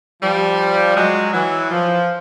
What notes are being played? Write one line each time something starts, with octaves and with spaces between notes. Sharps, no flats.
F3 G3
F#3 G#3
E3 F#3
F3